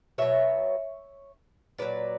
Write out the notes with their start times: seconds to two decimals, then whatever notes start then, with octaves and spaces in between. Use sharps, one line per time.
0.18 B2 F#3 C#5 E5
1.78 A#2 F#3 B4 D5